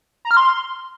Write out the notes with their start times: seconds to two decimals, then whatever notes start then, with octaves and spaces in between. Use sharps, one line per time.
0.25 A#5
0.31 F6
0.37 C6